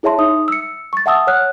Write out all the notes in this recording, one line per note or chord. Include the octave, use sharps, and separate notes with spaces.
E4 G#4 C#5 E5 A5 C6
D#4 E5 D#6
E6 C#7
C#6 A6
E5 F#5 A5 D#6 E6
C#5 F#5 F6 F#6